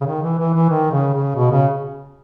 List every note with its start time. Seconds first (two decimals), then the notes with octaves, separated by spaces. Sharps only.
0.01 C#3
0.06 D#3
0.23 E3
0.39 E3
0.54 E3
0.70 D#3
0.92 C#3
1.14 C#3
1.35 B2
1.51 C#3